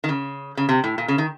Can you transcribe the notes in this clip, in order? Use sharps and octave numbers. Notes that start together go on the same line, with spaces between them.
D#3
C#3
C#3
C3
A2
A#2
C#3
D#3